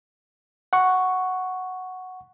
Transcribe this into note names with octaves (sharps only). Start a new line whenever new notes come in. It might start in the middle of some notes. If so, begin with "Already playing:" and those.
F#5 C#6